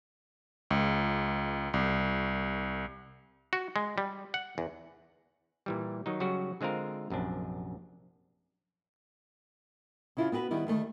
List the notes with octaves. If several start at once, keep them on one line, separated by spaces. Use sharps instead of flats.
C#2
C2
F#4
G#3
G3
F#5
E2
A#2 E3 G3
D#3 F#3 D#4
C#3 F#3 G3 C#4 F#4
D3 G#3 C4 F4 A#4
A#1 F#2 C3 D4
C#3 E4 F4
B3 F#4 G4 B4
D#3 G3 B3 E4
D2 D#3 A3